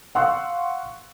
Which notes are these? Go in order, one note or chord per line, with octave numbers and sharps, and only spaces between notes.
F5 F#5 C6 C#6 E6 F#6